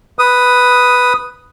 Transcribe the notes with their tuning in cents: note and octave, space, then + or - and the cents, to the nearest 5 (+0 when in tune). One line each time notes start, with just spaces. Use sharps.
B4 +0 D#6 +0